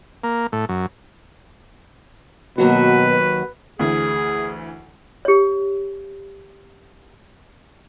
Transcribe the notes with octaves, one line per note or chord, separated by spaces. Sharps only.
A#3
A2
F#2
D#2 B2 F#3 F#4 B4
D2 E3 G#4
G4 C#5